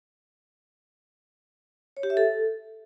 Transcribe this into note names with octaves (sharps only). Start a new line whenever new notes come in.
C#5
G4
E5
A4